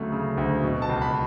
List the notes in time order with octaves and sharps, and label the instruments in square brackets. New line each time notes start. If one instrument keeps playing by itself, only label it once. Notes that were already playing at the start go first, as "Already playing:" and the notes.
Already playing: [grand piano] D2 C#3 F#3 A3
C#3
D2
B2
A5
C#2
B5